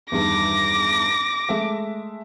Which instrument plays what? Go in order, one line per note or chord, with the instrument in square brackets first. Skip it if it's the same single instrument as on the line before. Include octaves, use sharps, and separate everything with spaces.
[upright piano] E2 G2 D#3 [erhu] D6 [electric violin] A#6
[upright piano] G#3 A3 E5